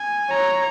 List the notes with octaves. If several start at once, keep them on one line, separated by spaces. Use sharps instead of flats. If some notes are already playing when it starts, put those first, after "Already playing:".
Already playing: G#5
C#5 A#5